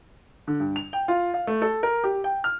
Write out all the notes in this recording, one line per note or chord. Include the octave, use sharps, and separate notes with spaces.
D3
G2
F7
G5
F4
F5
A3
A4
A#4
G4
G5
F6